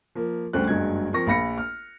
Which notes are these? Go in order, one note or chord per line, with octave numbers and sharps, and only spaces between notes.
F3 A#3
D2 D3 G3 C#4 C5 F#6
F#1 G2 F#3 G#3 G#6
F3 C4 A#4 C#6 A#6
A#1 F5 B5 A#6 C#7
F6